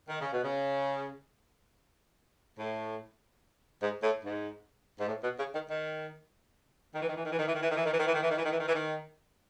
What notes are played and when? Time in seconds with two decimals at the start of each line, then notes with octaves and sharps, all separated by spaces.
0.09 D#3
0.20 C#3
0.32 B2
0.44 C#3
2.58 A2
3.82 G#2
4.03 A2
4.24 G#2
5.00 G#2
5.08 A2
5.23 B2
5.38 C#3
5.54 D#3
5.69 D#3
6.94 D#3
7.02 E3
7.09 D#3
7.16 E3
7.25 D#3
7.32 E3
7.39 D#3
7.47 E3
7.54 D#3
7.62 E3
7.70 D#3
7.76 E3
7.85 D#3
7.92 E3
7.99 D#3
8.07 E3
8.15 D#3
8.22 E3
8.30 D#3
8.37 E3
8.45 D#3
8.51 E3
8.60 D#3
8.67 E3
8.74 D#3